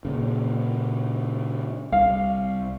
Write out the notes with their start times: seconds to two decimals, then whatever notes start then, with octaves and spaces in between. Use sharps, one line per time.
0.05 A#2 C#3
1.92 C2 F5